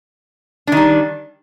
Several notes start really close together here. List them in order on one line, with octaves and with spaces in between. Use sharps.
D4 D#3 G3